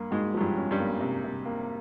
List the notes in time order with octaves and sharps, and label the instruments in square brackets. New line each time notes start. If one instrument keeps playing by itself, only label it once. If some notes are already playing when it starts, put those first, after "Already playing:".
Already playing: [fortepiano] G2 [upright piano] A#3
[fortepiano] G#2 G#3 [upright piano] F#4
[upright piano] F3 [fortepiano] F#3
[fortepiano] G2 G3
[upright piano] C#4
[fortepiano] G2 G3
[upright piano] A#3
C3
C3
A#3